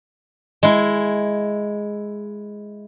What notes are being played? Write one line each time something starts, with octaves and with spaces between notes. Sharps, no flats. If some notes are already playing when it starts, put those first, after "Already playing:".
G#3 E4